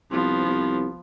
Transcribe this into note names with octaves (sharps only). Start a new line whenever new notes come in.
C2 F3 B3
C2